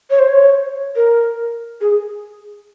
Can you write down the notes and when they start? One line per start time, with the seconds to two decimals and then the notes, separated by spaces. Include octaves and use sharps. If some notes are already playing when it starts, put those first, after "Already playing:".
0.10 C#5
0.19 C5
0.28 C#5
0.96 A#4
1.81 G#4